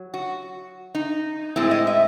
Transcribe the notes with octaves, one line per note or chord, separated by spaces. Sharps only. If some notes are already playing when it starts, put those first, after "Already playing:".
Already playing: F#3
F#4
D#4
A2 G#3 C4 E4
D#5
E5